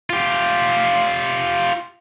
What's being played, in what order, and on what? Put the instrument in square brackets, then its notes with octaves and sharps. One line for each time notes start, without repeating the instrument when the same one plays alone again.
[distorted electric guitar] F4 G4